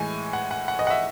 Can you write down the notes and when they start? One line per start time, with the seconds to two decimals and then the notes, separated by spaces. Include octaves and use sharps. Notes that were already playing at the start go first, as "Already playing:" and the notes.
Already playing: A2 E3 G#3 G#5
0.33 F#5
0.51 F#5
0.68 F#5
0.79 D#5
0.87 F#5
0.90 E5